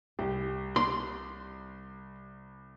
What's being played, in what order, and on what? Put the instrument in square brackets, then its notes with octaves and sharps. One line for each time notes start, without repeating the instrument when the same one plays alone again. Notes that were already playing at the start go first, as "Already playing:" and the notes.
[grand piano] C2 [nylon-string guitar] G4
[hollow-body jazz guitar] C6